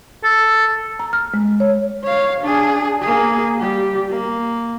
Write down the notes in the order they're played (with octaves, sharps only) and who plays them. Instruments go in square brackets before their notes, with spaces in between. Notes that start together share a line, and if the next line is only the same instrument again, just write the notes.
[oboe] A4
[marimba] A#5
F6
G#3
C#5
[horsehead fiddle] C#5 F5
D4 G#4
A#3 G#4
G3 G4
A#3